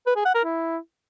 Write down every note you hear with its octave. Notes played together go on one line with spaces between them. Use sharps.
B4
G#4
F#5
A#4
E4